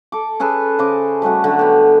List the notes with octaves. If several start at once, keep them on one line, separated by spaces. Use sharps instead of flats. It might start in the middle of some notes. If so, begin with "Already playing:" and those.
A4 D6
C#4 G#4 A4 B4
C#3 C5 D#5 D6
G3 A3 C#4 F#4
D3 F#3 A3
B3 G4